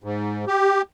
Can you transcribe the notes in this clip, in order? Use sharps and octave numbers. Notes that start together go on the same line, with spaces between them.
G#2
G4